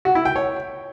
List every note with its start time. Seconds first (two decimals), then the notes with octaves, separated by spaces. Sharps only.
0.05 F#4
0.15 E4
0.25 G5
0.36 C#5